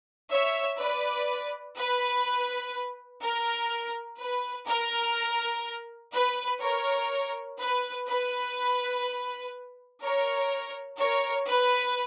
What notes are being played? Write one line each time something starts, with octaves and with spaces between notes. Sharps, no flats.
C#5 E5
B4 D5
B4
A#4
B4
A#4
B4
A#4 C#5
B4
B4
A#4 C#5
A#4 C#5
B4